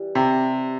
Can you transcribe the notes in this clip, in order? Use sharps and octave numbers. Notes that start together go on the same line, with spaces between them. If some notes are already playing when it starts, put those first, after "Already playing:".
Already playing: E3 G3
C3